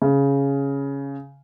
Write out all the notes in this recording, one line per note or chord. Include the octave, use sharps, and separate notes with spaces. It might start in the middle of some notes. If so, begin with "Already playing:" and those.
C#3